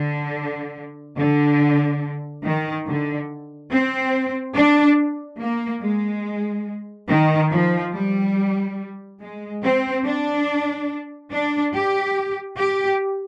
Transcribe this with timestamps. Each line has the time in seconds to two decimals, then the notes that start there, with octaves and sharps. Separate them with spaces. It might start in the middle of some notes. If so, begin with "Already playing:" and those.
Already playing: D3
1.18 D3
2.44 D#3
2.86 D3
3.71 C4
4.56 D4
5.40 A#3
5.81 G#3
7.09 D#3
7.51 F3
7.93 G3
9.20 G#3
9.62 C4
10.04 D4
11.31 D4
11.73 G4
12.58 G4